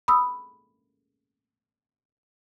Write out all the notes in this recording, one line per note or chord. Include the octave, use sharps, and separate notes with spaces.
B5 D#6 E6